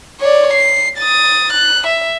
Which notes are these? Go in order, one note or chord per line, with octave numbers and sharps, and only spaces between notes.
C#5 D5
C7
D#6 A6
F#6
E5